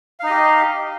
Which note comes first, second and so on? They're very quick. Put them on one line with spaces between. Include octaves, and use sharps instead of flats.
F5 D#4 D#5 G4